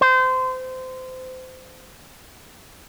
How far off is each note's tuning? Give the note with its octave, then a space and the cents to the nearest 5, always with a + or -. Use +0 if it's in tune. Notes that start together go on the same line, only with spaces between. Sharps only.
C5 -25